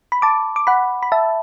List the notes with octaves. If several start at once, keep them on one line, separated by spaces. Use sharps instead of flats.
B5
A5 D6
D6
F#5 B5
B5
E5 A5